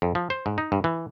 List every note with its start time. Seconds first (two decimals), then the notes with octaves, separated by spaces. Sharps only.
0.02 F2
0.15 F3
0.30 C5
0.46 G#2
0.58 D#4
0.72 G2
0.84 E3